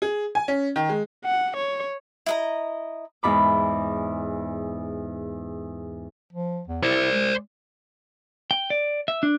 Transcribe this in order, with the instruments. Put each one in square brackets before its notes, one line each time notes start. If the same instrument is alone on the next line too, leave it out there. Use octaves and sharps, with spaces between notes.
[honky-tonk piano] G#4
G#5
C#4
D#3
G#3
[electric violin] F#5
C#5
[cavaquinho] E4 D#5 A#5
[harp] E2 G#2 B5 D6
[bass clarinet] F3
E2
[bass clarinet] E4 [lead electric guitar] C5 D5
[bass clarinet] G#3
[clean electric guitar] G5
D5
E5
D4